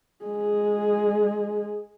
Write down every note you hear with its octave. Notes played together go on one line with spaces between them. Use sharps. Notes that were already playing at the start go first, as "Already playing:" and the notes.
G#3 G#4